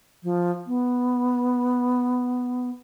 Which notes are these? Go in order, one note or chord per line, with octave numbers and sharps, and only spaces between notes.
F3
B3